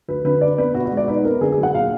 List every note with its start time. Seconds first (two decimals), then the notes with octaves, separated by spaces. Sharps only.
0.08 D2 B4
0.24 D3 B4
0.41 D4 D5
0.58 B3 B4
0.74 B2 F#4
0.85 F#4
0.91 G#3
0.97 D5
1.08 D#4 B4
1.24 B3 A#4
1.41 D3 G#4
1.52 G#4
1.57 F#3
1.63 F#5
1.74 A#2 F5